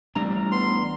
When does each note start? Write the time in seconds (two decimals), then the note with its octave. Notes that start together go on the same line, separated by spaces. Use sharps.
0.15 A1 G3 D4 A#5
0.52 B3 C6